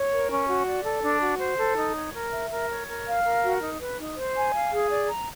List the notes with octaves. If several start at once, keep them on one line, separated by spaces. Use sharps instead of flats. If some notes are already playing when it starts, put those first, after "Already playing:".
Already playing: C#5
A#4
C#4
F#4
D5
A4
D4
F#4
C5
A4
D#4
C#5
A#4
E5
A#4
C#5
A#4
F5
A#4
F#4
D#4
B4
D#4
C5
G#5
F5
G#4
D5
A#5